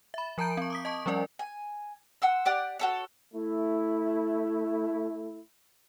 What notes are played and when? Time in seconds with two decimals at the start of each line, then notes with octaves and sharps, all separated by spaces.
0.14 E5 B5
0.38 F3 A#4 A5 A#5 G6 D7
0.57 C4 C#6
0.70 D6 D#6 B6
0.85 D#5 A5 C#6
1.06 F3 G3 C#4 A#4 D5
1.39 G#5
2.22 F#5 C6 E6
2.45 G4 D5 F#5
2.79 F#4 A4 C#5
3.34 A3 E4